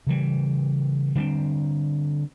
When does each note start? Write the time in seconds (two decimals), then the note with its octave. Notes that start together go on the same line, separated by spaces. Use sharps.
0.07 C#3 E3 G3
1.15 D3 G3 C4